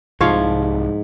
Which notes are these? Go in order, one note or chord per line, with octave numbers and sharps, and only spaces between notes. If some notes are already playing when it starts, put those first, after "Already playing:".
C2 G#2 F3 C#5 F5